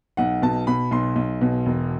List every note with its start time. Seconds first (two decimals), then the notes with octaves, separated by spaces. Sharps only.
0.17 B1 F#5
0.42 B2 A5
0.67 B2 B5
0.91 B1 C6
1.16 B1
1.41 B2
1.66 E1